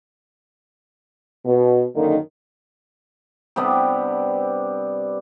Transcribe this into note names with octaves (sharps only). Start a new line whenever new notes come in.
B2
F#2 D3 D#3 A#3 D#4
C3 G3 B3 D4